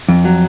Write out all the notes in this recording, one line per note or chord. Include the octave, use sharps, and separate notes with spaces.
F2
F#3